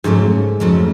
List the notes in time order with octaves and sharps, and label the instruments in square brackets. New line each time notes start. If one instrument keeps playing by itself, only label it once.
[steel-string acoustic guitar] F2 C#3 F#3 A3 [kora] G#2
[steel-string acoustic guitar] F2 C#3 F#3 A3